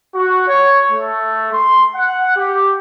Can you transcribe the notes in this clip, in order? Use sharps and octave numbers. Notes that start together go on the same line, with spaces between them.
F#4
C#5
A3
C6
F#5
G4